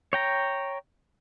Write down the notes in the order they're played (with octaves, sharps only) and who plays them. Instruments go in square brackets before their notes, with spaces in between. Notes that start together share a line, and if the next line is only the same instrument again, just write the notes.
[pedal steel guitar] C#5 G5 A#5